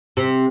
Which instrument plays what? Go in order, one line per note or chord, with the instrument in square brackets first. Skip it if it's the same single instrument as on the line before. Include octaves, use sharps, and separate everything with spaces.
[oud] C3